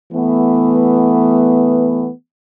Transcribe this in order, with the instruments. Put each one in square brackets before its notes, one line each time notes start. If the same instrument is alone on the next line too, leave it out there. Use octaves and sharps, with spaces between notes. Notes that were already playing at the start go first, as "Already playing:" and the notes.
[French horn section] E3 A3 B3